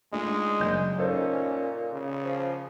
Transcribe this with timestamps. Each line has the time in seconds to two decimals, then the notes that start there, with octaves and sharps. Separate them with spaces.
0.13 G#3 A3 D4 D#4 F4
0.60 F#1 G6
0.99 A#2 C#4 D#4 A4 C5
1.93 C#3
2.24 F3